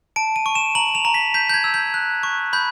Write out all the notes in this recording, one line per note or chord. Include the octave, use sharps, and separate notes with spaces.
A5 D7
D#7
C#6
E7
A#5 F#7
F7
A#5
B6
G6 B6
G6
G#6
E6
G6
F#6
C#6
B5 G6